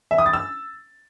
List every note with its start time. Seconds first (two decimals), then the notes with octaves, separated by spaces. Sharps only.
0.11 E5
0.18 D#6
0.26 A6
0.33 E6